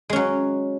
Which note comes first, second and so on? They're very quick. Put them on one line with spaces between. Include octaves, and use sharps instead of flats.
G#3 C#4 F#3